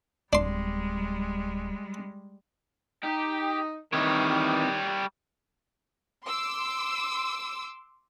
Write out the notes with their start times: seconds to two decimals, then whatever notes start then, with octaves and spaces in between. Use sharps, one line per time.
0.33 D1 G3 G#3 D4 C6
3.04 D#4 G4
3.93 C3 D#3 E3 G3 C#5
6.25 C6 D6 E6